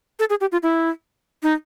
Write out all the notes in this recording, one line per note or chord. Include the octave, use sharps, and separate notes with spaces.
A4
G#4
G4
F4
E4
D#4